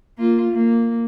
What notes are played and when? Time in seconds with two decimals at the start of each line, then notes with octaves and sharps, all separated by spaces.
0.17 A#3 F4
0.52 A#3